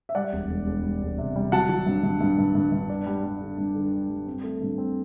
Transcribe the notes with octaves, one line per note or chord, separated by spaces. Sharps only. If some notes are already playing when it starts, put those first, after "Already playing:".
E5
G3 D5 F#5
E1
E1
E1
G3
E1
C3
G3
F#3 F#5 A5
F#3
G2
G2
G2
G2
G2
G2
D4
G3
G3
D3
G2
D3
D4
G3
C4
A3
G2
C4